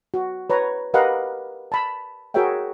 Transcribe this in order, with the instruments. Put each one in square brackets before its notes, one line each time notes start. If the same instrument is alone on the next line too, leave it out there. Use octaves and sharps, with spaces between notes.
[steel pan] F#4
B4 C#5 A#5
G4 A#4 B4 D#5 F5 F#5
A5 B5
F#4 G#4 A#4 C#5 E5 G5